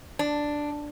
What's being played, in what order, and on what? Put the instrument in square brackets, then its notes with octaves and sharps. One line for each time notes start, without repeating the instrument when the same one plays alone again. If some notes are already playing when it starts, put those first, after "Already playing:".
[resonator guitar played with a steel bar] D4